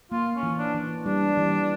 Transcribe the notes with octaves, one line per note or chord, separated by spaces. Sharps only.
A#3 F4
C#4
E3
D4
E3
G3 D4
E3